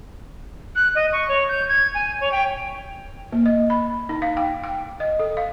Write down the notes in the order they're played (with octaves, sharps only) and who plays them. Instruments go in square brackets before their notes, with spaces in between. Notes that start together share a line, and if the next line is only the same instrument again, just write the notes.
[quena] F#6
D#5
C#6
C#5
G6
G#6
G#5
C#5
G5
[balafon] A#3
D#5
B5
D#4
F5
G5
G5
D#5
A4
F5